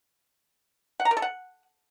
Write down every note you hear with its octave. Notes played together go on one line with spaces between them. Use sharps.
F#5
A#5
A#4
A4
F#5